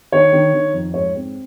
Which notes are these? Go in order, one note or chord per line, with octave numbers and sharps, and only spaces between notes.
D#3 C#5
D#3
D#3
F2
G#2 C#5
C4